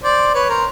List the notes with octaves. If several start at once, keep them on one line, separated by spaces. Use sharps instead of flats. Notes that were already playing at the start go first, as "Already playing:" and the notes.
C5 D5
B4 C#5
A#4 C5